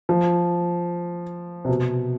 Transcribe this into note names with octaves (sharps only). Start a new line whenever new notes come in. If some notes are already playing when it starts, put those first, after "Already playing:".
F3
C3
B2